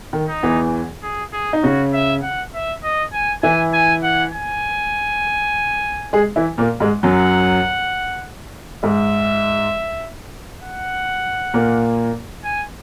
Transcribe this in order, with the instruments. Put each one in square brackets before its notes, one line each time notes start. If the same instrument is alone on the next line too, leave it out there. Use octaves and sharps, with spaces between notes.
[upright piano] D#3
[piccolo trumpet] D#4
[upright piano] E2 E3
[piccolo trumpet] G#4
G#4
[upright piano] D#4
[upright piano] C#3 C#4 [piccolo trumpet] F#4
[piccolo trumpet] E5
F#5
E5
D#5
G#5
[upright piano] E3 E4 [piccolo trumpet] G#5
[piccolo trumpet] G#5
F#5
G#5
[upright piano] G#3 G#4
E3 E4
A#2 A#3
G#2 G#3
[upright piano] F#2 F#3 [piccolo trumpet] F#5
[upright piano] G#2 G#3 [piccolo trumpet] E5
[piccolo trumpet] F#5
[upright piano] A#2 A#3
[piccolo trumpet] G#5